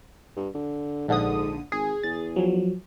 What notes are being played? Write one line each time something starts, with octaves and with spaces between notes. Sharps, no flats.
G2
D3
A#1 G#2 D3 D#6
G#1 G#4
E2 A6
F3 F#3